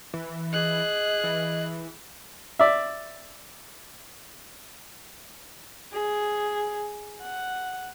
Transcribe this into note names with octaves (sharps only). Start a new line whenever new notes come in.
E3
G#4 D#5 F#6
E3
D5 E5
G#4
F#5